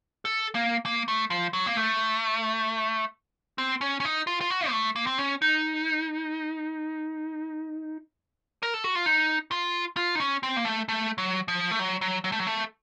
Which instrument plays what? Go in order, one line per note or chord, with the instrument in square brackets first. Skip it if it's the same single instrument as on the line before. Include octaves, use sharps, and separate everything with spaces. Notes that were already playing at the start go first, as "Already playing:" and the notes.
[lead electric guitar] A4
A#3
A#3
A3
F3
F#3
A#3
A3
C4
C#4
C#4
D#4
F4
F4
F#4
A#3
A3
A#3
C4
C#4
D#4
A#4
A4
F#4
F4
D#4
F4
F4
D#4
C#4
C4
A#3
A3
A3
F#3
F3
A3
F#3
F#3
F#3
A3
F#3
A3